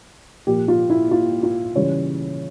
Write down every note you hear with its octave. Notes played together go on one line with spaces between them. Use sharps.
A#2 F3 G4
F4
E4
F4
F4
C#3 E3 G3 C#5